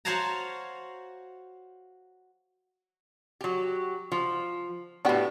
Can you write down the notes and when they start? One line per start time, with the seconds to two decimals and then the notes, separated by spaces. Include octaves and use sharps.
0.05 F#4 C5 C#5 F5 A5 A#5
3.41 F#3 G4
4.12 F3
5.05 A2 B3 D4 F#4 G4